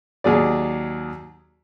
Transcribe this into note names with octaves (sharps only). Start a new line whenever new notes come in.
D#2 F#3 G#4 D5